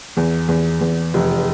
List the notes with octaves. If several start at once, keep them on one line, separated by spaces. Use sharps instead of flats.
E2
E2
E2
F1